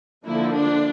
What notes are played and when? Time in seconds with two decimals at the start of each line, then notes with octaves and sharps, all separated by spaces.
0.24 D3 F3 A#3 E4
0.55 D4